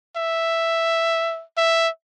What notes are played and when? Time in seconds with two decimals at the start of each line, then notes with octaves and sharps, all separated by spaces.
0.16 E5
1.57 E5